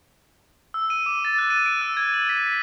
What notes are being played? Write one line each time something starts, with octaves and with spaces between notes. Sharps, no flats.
E6
D#7
D6
A6
F#6
D#7
D7
E6
G#6
F#7
B6
B6